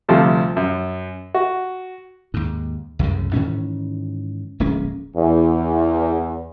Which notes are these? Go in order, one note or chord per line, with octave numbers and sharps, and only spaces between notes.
D2 C3 F3 G3 A3
F#2
F#4
D#2 G#2
C2 F#2 A2 C#3
G#2 D#3 E3 C#4
D1 A#1 G#3 C#4
E2